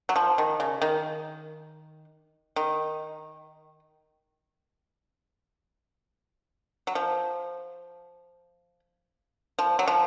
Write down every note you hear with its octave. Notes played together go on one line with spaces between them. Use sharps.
F#3
F3
D#3
C#3
D#3
D#3
F#3
F3
F3
F#3
F3